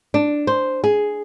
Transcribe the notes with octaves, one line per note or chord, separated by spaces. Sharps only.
D4
C5
G#4